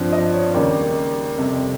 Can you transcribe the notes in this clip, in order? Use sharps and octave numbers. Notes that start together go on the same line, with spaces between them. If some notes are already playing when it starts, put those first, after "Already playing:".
Already playing: G2 F3 C4
D#5
C#5
D#2 C#3 G3 A#3
F2 C3 G3